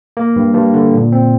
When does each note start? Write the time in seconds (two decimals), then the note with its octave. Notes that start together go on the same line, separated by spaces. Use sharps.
0.17 A#3
0.36 G2
0.55 G2
0.74 D3
0.94 A#2
1.12 C4